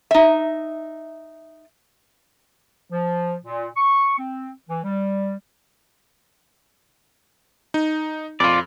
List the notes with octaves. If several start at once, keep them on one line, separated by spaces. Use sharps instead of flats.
D#4 E5
F3
A#2
C#6
C4
E3
G3
D#4
F2 F4 D5